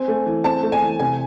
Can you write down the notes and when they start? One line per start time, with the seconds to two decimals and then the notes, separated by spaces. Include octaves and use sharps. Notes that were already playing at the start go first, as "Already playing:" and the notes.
Already playing: C4 G#5
0.08 A3
0.26 E3
0.44 C4 A5
0.63 A3
0.72 G#5
0.81 E3
0.99 C3 G#5